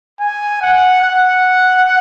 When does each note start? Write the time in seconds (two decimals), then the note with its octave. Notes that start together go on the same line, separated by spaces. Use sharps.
0.20 G#5
0.61 F#5
1.02 F#5